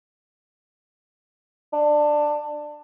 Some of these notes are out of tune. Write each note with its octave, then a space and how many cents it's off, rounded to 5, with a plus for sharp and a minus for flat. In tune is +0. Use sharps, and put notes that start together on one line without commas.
D4 +15